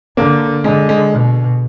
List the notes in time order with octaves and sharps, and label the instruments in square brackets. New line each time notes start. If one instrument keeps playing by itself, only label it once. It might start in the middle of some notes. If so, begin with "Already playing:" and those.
[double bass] D3 [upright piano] A#3
[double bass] D3 [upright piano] G#3
[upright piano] G#3
[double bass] B2